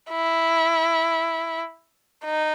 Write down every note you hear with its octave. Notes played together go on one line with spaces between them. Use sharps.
E4
D#4